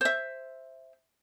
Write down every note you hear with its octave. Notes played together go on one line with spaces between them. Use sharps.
C5 E5